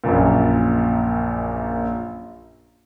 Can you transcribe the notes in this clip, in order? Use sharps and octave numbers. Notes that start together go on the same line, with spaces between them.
A#1 F#2 A#2